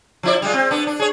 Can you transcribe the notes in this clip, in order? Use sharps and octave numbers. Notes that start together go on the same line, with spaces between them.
F3 E4 D5
G3 G#3 F4
C4
B3 D4
D4
G#4 C#5